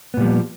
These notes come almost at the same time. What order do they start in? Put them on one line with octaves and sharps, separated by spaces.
B3 A#2 G3 F3